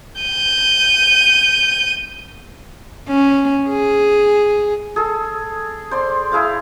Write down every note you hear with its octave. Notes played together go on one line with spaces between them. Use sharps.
G6 D#7
C#4
G#4
G#4 A4
C5 D5 C6
E4 G#4 F5 D6